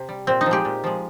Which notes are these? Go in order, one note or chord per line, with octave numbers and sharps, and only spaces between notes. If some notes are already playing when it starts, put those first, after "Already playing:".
Already playing: C3
G3
A#2 C4
D#4
F3
G#3 G4
A#2
F3 G#3